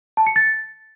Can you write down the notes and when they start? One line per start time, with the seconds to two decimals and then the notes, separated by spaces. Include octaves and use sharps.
0.17 A5
0.27 C#7
0.36 A6